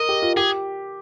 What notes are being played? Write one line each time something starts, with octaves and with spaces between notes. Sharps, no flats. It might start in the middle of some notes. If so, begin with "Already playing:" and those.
Already playing: A#4 D#5
G4
F4
G4 G#4